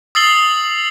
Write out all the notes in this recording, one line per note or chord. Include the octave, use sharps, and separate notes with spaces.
D#6 E6 A6 C7 F#7 G7